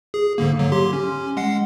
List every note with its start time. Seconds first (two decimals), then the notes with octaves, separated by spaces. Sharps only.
0.14 G#4
0.38 G#2 D3 A#3
0.59 D3 F#3
0.72 G4 C6
0.93 C#4
1.37 G#3 F#5 C7